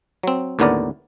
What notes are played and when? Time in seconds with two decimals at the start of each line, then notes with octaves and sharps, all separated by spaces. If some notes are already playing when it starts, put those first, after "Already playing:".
0.23 F#3 C4
0.59 D#2 A2 D3 B3 A#4 D5